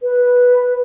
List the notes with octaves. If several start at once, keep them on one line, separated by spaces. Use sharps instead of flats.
B4